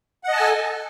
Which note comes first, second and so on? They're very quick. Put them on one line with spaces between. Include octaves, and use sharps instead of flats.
F#5 D#5 A5 G#5 A4